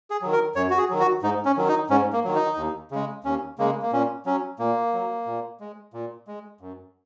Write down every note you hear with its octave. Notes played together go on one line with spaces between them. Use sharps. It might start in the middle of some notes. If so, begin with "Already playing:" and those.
G#4
D#3 F#3
A#4
F#2 C#5
F#4
G#4
D#3 F#3
F#4
G#2 D#4
C#4
D#3 F#3
D#4
G#2 C#4
A#3
D#3 F#3
D#4
D#2
C#3 G#3
D#2 C#4
C#3 G#3 A#3
A#3
A#2 C#4
F#3 C#4
A#2 A#3
F#3
A#2
G#3
A#2
G#3
F#2